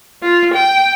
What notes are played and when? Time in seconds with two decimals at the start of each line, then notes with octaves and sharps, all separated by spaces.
0.23 F4
0.53 G5